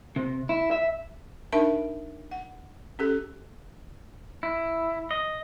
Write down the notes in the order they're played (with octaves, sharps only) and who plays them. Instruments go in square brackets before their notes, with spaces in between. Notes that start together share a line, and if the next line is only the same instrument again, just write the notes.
[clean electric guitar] C3
E4
E5
[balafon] D4 D#4 A#4 E5 A5
F#5
C#4 G4 A4
[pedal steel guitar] E4
D#5